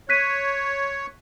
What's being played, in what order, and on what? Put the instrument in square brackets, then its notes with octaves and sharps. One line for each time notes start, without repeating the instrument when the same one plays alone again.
[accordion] C#5 [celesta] F#6 B6 D#7